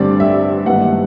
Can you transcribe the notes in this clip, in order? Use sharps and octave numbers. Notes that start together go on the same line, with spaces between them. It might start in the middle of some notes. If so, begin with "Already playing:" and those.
Already playing: A1 G2 D3 G3 C4 D5
E5
G#1 G2 E3 G3 A#3 F#5